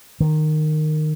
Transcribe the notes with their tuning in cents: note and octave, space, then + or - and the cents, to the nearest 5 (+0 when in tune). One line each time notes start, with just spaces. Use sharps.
D#3 -15